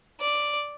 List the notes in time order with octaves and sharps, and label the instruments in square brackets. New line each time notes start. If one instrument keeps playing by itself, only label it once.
[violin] D5